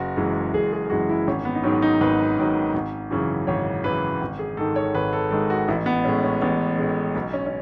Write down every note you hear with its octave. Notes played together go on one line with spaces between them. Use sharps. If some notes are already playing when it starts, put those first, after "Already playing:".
Already playing: F#1 F#4
F#2 E3 G#3
F#1 G#4
G#4
G#4
F#2 E3 G#3 F#4
E4
G#1 C#4
B3
D#4
G#2 D#3 F#3 C#4
D#4
G#1 B4
G#2 D#3 F#3
G#1
F#2 C#3 E3
G#1 C#5
F#2 C#3 E3 B4
G#1
G#4
G#2 D#3 G#3 A4
C#5
G#1 B4
A4
G#2 D#3 G#3 A4
F#4
A1 E4
B3
A2 G#3 C#4
C#4
A1 B3
A2 G#3
B1 B3
C#4
C#4